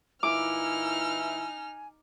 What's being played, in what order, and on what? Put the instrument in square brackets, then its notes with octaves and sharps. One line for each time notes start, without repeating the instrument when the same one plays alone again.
[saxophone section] A#2 E3 E4 [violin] D#4 F6 [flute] G#5 [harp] D6